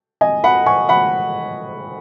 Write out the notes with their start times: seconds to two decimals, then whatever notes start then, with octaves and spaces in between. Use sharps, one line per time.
0.21 D#5 G#5
0.44 F#5 B5
0.66 G#5 C#6
0.89 F#5 B5